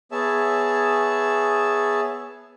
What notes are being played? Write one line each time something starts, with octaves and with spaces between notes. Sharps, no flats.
B3 G#4 C#5 E5 A5